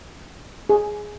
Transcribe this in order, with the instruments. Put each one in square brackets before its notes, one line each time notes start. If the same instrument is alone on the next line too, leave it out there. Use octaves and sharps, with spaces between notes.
[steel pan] G#4